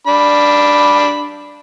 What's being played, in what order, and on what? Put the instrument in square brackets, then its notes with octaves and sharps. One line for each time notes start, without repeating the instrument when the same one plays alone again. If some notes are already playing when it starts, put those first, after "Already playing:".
[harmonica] D4 B5